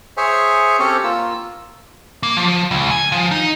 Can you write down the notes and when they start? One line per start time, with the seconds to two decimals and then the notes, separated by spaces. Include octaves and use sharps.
0.17 G#4 C5 C#5 E5 G#5
0.79 C4 C#4 G4 A4 C#5
1.04 A#3 F4 E6
2.23 A#3
2.37 F3
2.71 C#2
2.91 G#5
3.12 F3
3.31 D#4